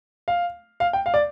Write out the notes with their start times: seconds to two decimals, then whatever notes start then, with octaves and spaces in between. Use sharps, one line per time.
0.28 F5
0.80 F5
0.93 G5
1.06 F5
1.14 D5